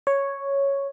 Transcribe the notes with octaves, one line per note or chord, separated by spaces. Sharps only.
C#5